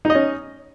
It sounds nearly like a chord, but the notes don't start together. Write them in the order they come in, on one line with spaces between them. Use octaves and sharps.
D#4 D#5 C#4